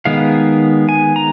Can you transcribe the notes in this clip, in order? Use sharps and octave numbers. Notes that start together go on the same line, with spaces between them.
D#3 G#3 B3 F5
G#5
A#5